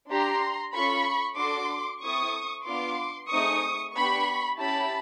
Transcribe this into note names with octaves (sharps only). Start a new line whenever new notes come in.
D4 G4 A#5 C6
C#4 F4 A4 B5 C#6
D4 F#4 A4 C6 D6
C4 E4 A4 C#6 D#6
B3 D4 F4 C6 D6
A3 C4 D#4 G#4 C#6 D#6
B3 D4 G4 B5 C#6
C#4 E4 G4 A5 B5